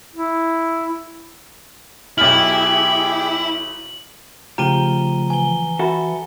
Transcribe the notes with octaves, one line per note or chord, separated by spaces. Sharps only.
E4
B1 E4 G4 G#4 F6 F#7
C#3 F3 A3 G4 A#5 D#7 G7
E3 G#5 G7
F#4 A4 E5 B5